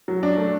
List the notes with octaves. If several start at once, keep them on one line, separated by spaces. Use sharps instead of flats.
F#3
D4
A3